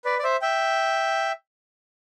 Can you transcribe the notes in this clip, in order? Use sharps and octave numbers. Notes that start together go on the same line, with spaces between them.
B4 D5
D5
C5 E5
E5 G5